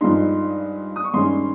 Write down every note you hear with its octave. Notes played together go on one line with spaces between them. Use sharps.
G2 F3 G#3 D#4 C6
D#6
C#6
G2 D#3 G#3 C#4 C6